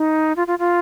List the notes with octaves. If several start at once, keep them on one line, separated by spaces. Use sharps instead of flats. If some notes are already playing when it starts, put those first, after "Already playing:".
Already playing: D#4
F4
F4
F4